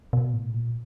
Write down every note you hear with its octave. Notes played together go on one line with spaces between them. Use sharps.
B2
A2
A#2